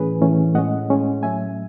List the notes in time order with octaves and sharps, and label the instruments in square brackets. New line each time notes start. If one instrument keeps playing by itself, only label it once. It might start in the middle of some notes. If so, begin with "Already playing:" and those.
Already playing: [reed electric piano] A2 E3 A3 C#4 G#4 B4
A2 E3 A3 C#4
A2 G#3 C#4 D#5 F#5
A2 G#3 C#4
A2 F#3 A3 E5 G#5